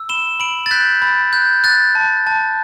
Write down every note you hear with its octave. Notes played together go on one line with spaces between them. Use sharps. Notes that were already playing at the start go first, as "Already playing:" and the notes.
Already playing: E6
B5 E7 G7
B5 D7 F#7
A6
F#6 G6 B6
B5 A6
F#6 G6
F#6 A6
A5
A5